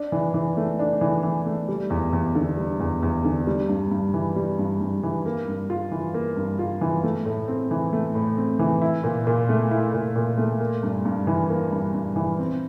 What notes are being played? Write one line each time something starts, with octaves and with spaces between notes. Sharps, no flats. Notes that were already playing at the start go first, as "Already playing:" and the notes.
Already playing: D4
E3
E3
A3
D4
E3
E3
A3
G3
E2
E2
D3
G3
E2
E2
D3
G3
G2
G2
E3
G3
G2
G2
E3
A#3
G2
F4
E3
A#3
G2
F4
E3
A3
A2
C4
E3
A3
A2
C4
E3
E4
A#2
A#2
A3
E4
A#2
A#2
A3
A#3
G2
G2
E3
A#3
G2
G2
E3
C4